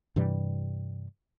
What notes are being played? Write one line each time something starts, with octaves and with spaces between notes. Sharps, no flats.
G2 C3 E3 G3